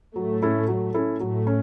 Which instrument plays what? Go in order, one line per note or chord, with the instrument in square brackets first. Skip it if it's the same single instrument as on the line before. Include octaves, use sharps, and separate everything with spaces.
[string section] A2 A3 [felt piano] F#3
[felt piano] C#4 E4 A4
F#3
C#4 E4 A4
[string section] A2 A3 [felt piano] F#3
[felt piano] C#4